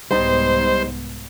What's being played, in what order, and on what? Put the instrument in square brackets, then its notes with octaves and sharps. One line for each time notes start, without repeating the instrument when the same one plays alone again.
[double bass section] C2 G#2 B3 [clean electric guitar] G3 D#4 [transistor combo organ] C5